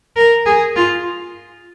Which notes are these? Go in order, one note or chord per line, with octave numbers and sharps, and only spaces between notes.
A#4
G#4
F4